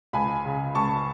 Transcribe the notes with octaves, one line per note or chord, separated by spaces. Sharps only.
C#2 G#5 B5
C#3
C#2 A5 C#6